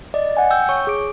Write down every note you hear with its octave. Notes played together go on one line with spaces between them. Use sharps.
D5 D#5
F#5 G#5
G5 E6 G6
C#5 C#6
G#4 D6 D7